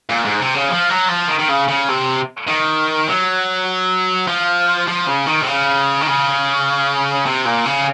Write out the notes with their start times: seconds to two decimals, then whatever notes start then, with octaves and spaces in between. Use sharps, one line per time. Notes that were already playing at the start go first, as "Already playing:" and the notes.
0.10 A#2
0.25 G#2
0.40 C3
0.54 C#3
0.69 F3
0.90 F#3
1.09 F3
1.28 D#3
1.39 D#3
1.49 C#3
1.68 C#3
1.88 C3
2.48 D#3
3.08 F#3
4.27 F3
4.88 F3
5.07 C#3
5.26 D#3
5.42 C3
5.47 C#3
6.01 D#3
6.07 C#3
7.26 C3
7.45 A#2
7.65 C#3